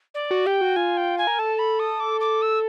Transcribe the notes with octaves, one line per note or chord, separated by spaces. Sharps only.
D5
F#4
G4 G5
F#4
F4 G#5
G5
G#5
A#4
A4 A5
B5
D#6
D6
D6
E6